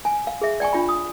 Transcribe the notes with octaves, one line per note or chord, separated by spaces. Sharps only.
G#5
F5
G#4 E5
D5 G5 G#5 C#6
D4 F4 G5 B5
D#6